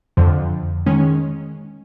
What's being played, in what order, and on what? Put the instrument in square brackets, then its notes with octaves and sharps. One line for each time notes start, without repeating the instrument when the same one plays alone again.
[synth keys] F2 D3 F3
D#3 G#3 C#4